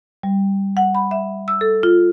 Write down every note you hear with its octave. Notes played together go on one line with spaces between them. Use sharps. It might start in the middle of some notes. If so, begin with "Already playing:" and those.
G3
F#5
B5
E5
E6
A4
F4